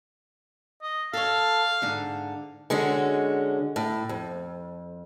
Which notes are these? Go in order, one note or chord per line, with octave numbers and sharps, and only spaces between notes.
D#5
A4 C#5 F5
G#2 D3
D3 G#3 C#4 F#4
A2
F2